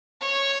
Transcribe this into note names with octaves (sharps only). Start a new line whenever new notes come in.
C#5